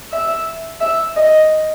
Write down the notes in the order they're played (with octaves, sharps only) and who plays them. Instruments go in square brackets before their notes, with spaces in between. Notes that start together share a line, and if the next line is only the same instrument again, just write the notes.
[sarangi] E5
E5
D#5